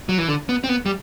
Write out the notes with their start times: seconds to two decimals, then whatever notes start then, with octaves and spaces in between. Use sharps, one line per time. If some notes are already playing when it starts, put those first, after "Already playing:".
0.09 F#3
0.18 E3
0.28 D3
0.49 B3
0.64 C4
0.69 B3
0.86 G3